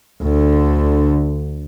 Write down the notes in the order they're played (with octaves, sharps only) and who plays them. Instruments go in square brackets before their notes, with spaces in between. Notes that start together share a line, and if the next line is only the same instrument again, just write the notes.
[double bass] D2 D3